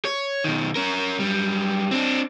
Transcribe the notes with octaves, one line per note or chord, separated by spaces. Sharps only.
C#5
B2 D#3
C#4 A#4
F#2 G3
C4 D4